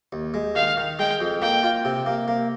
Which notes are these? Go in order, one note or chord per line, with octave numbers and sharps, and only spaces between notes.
D#2
G#3
D#3 F5
D#3
G#3 G5
F2
A#3 G5
F4
C3
A#3
A#3